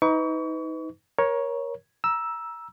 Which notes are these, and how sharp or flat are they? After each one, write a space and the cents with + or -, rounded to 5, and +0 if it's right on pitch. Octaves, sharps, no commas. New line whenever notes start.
D#4 +30 B4 +25 C#6 +35
A#4 +25 C#5 +0
A#5 +25 E6 +0